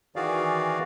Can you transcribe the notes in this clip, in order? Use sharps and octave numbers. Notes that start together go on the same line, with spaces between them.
D#3 E3 F#4 G#4 D5 F5